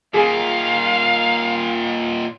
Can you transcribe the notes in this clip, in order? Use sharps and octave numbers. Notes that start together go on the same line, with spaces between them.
A#2 D#3 G#4 F5